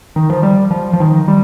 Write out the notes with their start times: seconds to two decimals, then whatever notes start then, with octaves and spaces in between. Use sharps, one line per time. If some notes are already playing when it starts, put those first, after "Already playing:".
0.16 D#3
0.30 F3
0.43 G3
0.71 F3
0.93 F3
1.00 D#3
1.28 G3